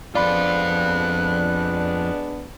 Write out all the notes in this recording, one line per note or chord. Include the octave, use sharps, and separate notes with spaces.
F2 G#3 B3 D4 F4 D5 B5 F#6